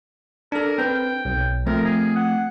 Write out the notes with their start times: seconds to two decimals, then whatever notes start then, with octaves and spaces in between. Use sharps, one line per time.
0.52 D4 A4 A#4
0.78 C4 B4 G5
1.25 B1
1.67 F3 A3 C4 A#4
1.85 G#4
2.16 F#5